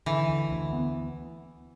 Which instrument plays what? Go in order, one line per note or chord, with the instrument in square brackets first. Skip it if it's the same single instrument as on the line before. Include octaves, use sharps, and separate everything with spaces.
[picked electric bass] D3 [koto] E3
[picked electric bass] D2
D2
B3